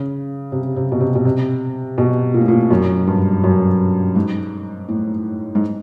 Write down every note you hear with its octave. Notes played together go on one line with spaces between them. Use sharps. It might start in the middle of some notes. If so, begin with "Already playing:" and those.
Already playing: C#3
C3
C3
B2
C3
B2
C3
B2
A#2
A2
A#2
F#2
G2
F#2
G#2
A2
G#2